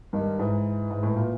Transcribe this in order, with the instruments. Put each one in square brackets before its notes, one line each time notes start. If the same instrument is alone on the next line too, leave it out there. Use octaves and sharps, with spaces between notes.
[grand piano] G2 [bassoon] D#3
[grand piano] G#2 [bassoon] E3
[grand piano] G#2
A2
A#2